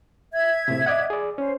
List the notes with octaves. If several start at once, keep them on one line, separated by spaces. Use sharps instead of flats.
E5 G#6
A2 C3
D5 D#5 F#5
G#4 D5
C#4 C5